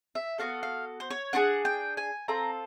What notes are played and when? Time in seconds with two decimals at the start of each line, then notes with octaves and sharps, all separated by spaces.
0.15 E5
0.38 B3 D4 F#4 A4 F5
0.63 F5
1.00 C5
1.10 C#5
1.33 D4 F4 G#4 F#5
1.65 G5
1.97 G#5
2.28 C4 F4 A4 A#5